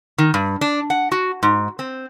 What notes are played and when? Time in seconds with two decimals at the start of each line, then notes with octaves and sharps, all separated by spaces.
0.18 D#3
0.34 G2
0.61 D4
0.90 F#5
1.12 F#4
1.43 G#2
1.79 C4